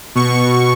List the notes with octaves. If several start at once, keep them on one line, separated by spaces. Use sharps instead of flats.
B2 C#6